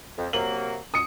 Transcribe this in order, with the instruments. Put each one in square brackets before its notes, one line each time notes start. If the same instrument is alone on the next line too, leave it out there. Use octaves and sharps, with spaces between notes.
[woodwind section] F2
[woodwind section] C3 F#3 A#3 [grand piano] F#7
[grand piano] D#6 C#7